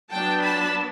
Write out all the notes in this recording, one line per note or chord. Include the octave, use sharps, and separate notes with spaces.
F#3 B3 D4 G5 A5
A5 B5